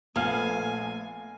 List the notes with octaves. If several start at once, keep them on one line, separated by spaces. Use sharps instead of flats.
A#1 A3 B3 F5 G#5